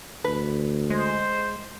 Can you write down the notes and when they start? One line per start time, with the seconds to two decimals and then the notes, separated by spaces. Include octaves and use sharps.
0.24 D2 B4
0.90 G#3 C5